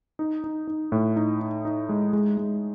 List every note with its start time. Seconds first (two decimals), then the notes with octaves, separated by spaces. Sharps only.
0.19 D#4
0.44 D#4
0.67 D#4
0.92 A2
1.16 D#4
1.41 D#4
1.65 D#4
1.89 G#3
2.13 G#3
2.37 G#3